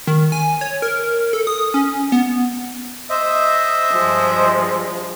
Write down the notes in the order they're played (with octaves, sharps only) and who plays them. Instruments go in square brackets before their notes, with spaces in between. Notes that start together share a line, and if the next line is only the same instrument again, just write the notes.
[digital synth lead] D#3
G#5
C#5
A#4
A4
D#6
C#4
B3
[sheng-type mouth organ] C5 D#5 E5
[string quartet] G2 F3 G#3